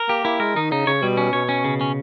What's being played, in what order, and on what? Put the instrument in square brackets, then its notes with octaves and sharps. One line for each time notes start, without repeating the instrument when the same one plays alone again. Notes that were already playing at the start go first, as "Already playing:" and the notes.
Already playing: [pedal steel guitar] A#4
[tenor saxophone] A#3 [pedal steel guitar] G4
[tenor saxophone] A#3 [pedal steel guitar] E4
[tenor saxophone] G#3 [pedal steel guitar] A#4
[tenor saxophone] D#3 [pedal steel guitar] D#4
[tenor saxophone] C#3 [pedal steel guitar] D#4
[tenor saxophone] C#3 [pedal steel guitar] C#5
[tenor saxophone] B2 [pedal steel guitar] G3
[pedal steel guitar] C#4
[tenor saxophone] B2 [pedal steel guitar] C#5
[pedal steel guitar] C#4
C#3
C#4